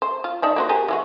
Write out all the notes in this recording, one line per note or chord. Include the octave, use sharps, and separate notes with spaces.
C5
F4
F3 D4 D#4
A#3 F#4 C5
G4 G#4 A#4
E3 G#3 F#4